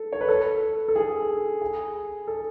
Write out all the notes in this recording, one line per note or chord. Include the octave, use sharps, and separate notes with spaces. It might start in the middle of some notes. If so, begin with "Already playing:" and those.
Already playing: A4
C#5
B4
A4
A4
G#4
G#4
A4